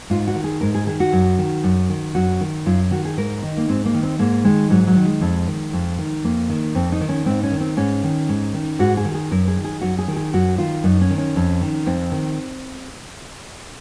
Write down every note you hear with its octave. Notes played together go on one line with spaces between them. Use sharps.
G#2 F4
F#4
D#3
G#4
G#2 A#4
G#4
D#3 G#4
F#4
F#2
D#3
F#2
D#3
F#2 F#4
D#3
F#2 F4
D#3 F#4
G#4
G#2 A#4
D#3 D#4
A#3
G#2 C4
A#3
D#3
C4
G#2 A#3
D#3 G#3
G#2 F#3
F#3
D#3
G#3
F2
D#3
F2
D#3
F2 A#3
D#3
F2 C4
D#4
D#3
C#4
G#2 C4
C#4
D#3
C4
G#2 C#4
D#3
G#2
D#3
G#2 F#4
G#4
D#3
G#4
F#2 A#4
G#4
D#3
G#4
F#2 F#4
G#4
D#3
G#4
F#2 F#4
D#3 F4
F#2 D#4
C#4
D#3
C#4
F2
D#3
F2 C4
D#3